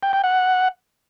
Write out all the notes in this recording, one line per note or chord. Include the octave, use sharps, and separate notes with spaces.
G5
G5
F#5